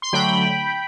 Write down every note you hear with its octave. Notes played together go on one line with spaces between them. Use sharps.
C6
D3 F#3 A3 G5 B5